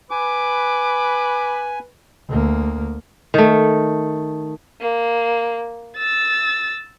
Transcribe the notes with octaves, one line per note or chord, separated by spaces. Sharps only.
B4 G#5 D6
D2 A#3
D#3 A3
A#3
E6 A6